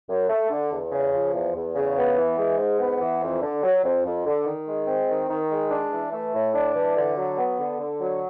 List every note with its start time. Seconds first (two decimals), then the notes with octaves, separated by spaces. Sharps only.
0.09 F#2
0.29 A3
0.50 D3
0.71 E2
0.92 C#3
1.14 F3
1.34 E2
1.55 E2
1.75 C#3
1.96 B3
2.17 E3
2.38 G#3
2.58 G#2
2.80 B3
3.01 E3
3.22 F2
3.42 D3
3.63 F#3
3.84 F2
4.05 F2
4.26 D3
4.46 D#3
4.67 G#3
4.87 C4
5.09 D#3
5.29 D#3
5.50 G#3
5.71 D4
5.92 E3
6.12 A3
6.34 A2
6.54 D4
6.74 E3
6.96 D3
7.16 F#3
7.38 B3
7.59 D3
7.79 D3
8.01 F#3